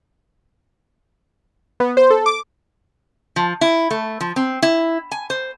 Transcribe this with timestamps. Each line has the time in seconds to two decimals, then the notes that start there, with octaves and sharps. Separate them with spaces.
1.80 B3
1.97 C5
2.10 A4
2.26 D6
3.36 F3
3.61 E4
3.91 A3
4.20 F3
4.36 C4
4.62 E4
5.11 G#5
5.30 C5